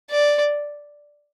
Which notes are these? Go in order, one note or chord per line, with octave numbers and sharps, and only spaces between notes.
D5